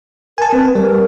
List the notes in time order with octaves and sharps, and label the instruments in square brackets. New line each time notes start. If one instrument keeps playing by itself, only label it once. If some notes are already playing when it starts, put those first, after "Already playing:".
[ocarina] A#4 [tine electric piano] G#5 A5
[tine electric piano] C4 [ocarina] B4
[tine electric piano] G3 [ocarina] A#4